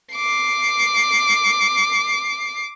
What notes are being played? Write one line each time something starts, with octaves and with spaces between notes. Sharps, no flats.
D6 C7